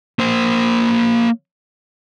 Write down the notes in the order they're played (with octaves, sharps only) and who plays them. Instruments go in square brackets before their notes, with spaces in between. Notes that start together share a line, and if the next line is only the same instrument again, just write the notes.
[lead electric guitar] A#3 C5